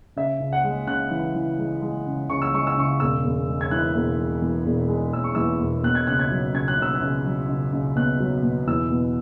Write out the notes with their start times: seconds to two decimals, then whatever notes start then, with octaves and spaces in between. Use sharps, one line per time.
0.16 C#3 E5
0.40 C#2
0.53 F#5
0.64 G#3
0.87 C#3 F#6
1.11 E3
1.35 E3
1.58 G#3
1.82 G#3
2.06 C#3
2.29 C#2 C#6
2.42 E6
2.53 G#3 C#6
2.67 E6
2.77 C#3 C#6
3.00 E1 E6
3.24 E1
3.48 G#3
3.61 G#6
3.71 E3 F#6
3.95 E1
4.19 G#3
4.42 E2
4.66 E1
4.89 G#3
5.13 E1 E6
5.24 C#6
5.35 E2 E6
5.60 E1
5.83 B2 F#6
5.95 G#6
6.07 C#2 F#6
6.19 G#6
6.31 F#3
6.54 C#2 G#6
6.68 F#6
6.78 C#2 E6
6.95 F#6
7.01 C#2
7.26 F#3
7.48 C#2
7.73 C#2
7.96 B2 F#6
8.20 F#3
8.43 B2
8.67 E2 E6
8.90 B2